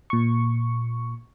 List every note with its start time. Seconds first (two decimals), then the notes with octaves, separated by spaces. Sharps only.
0.10 A#2 C#6